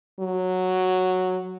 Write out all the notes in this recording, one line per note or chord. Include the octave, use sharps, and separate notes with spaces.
F#3